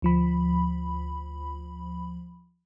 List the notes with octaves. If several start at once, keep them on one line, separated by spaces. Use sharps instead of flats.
D2 F3 B5